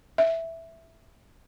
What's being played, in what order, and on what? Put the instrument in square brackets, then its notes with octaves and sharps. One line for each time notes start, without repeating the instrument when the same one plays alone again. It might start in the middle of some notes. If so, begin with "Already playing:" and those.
[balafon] E5